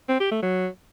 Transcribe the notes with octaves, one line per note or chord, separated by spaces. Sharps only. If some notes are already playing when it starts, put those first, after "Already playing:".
C4
G4
A3
F#3